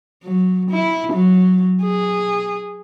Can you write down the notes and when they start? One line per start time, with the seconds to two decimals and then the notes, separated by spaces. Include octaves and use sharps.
0.24 F#3
0.70 E4
1.13 F#3
1.83 G#4